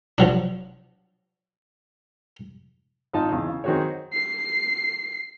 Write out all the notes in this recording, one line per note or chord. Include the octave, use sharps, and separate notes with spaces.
F3 F#3 D4
G#1 D#4 F4 A5
E2 C#3
C#3
D#3 C4 F#4 G#4 C#5
C7